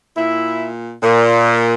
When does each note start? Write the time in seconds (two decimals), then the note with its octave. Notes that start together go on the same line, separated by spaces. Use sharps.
0.16 A#2 E4
1.03 A#2